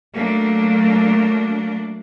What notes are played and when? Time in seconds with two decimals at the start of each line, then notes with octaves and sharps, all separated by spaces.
0.14 F#3 A3 A#3 D4